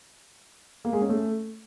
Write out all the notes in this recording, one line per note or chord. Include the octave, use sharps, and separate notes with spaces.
A#3
G#3
C#4
A3